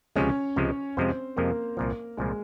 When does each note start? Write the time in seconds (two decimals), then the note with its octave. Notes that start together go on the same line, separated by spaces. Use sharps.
0.16 C#2 C3 F3 G#3 C#4 C#5
0.56 C#2 C3 F3 G#3
0.97 F2 C3 F3 G#3 C4 C5
1.36 F2 C3 F3 G#3 A#3 A#4
1.77 C2 A#2 F3
2.17 C2 A#2 F3 G#3 G#4